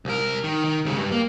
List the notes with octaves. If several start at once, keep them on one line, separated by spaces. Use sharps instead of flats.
C2 A#4
D#3
D#3
C2 C#3
G2
A#3